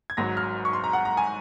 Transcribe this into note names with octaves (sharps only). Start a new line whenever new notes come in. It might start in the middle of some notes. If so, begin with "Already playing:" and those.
G#6
G#1 G#2 F#3 A#6
F6
C#6
C6
A#5
F#5
A#5
G#5